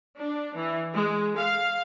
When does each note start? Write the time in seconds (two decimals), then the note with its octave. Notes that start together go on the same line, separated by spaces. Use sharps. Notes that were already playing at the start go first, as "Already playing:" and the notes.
0.18 D4
0.56 E3
0.93 G#3
1.38 F5